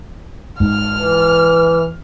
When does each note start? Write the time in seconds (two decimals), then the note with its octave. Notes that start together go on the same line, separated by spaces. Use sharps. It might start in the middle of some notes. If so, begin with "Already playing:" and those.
0.60 G#2 F6
0.92 E3